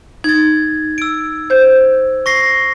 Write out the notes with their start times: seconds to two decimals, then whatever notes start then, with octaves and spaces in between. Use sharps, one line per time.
0.24 D#4 G#6 A6
0.98 E6 D7
1.50 C5 G6
2.26 C#6 A#6 C7